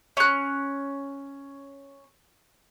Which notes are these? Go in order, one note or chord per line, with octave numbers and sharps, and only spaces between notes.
C#4 F#6